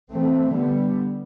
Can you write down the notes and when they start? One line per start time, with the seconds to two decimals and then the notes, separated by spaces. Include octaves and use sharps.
0.12 E3 A3 C4
0.53 D3 G3 B3